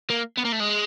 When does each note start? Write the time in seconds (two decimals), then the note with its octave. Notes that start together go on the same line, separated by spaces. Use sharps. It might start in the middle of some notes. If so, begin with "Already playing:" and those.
0.10 A#3
0.37 B3
0.45 A#3
0.52 A3
0.60 G#3